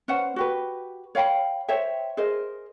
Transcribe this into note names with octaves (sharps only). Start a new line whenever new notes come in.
C#4 B4 C5 F#5
F#4 G4 B4
C#5 F5 G5 B5
C5 C#5 E5 G5
G#4 A#4 C5 D#5